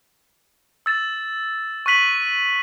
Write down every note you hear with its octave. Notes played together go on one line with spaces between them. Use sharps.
E6 A6 E7
C#6 F#6 B6 D#7 F#7